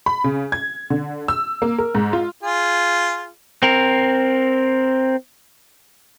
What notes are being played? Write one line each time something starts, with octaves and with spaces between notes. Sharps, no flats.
B5
C#3
G#6
D3
E6
A#3
A#4
G#2
F4
F4 G#4
C4 A#4